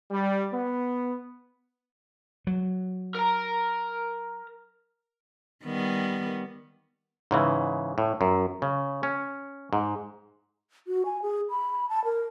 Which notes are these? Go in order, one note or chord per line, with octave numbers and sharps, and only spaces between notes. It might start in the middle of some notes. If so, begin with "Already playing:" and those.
G3
B3
F#3
A#4 A#5
D#3 G3 B3
G#2 C#3 E3
A2
F#2
C#3
C#4
G#2
F#4
G#5
G#4
B5
A5
A#4